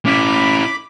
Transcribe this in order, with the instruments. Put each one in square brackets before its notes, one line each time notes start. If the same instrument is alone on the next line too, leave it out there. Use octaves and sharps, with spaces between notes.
[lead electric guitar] C#4 E4 [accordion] B5 D6